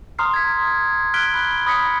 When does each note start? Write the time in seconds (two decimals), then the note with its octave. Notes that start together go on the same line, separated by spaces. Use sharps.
0.19 A#5 C6 D#6 F6 C7
0.34 G#6 B6
1.14 F6 F#6 G#6 B6 D7 G7
1.34 B5 F#6
1.66 B5 D#6 A#6 B6 C#7